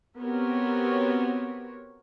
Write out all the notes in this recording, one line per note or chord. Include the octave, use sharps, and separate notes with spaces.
B3 C4 F#4 G4 A#4 C#5